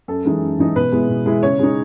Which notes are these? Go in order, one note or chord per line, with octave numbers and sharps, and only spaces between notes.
F#2 A4
E3 G#3 D#4
F#2
E3 G#3 D#4
B2 B4
G#3 B3 E4
B2
G#3 B3 E4
C#3 C#5
G#3 D#4